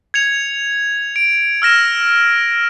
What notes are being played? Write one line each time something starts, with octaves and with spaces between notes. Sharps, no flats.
G#6 C#7 F7
D7
E6 F6 A#6 E7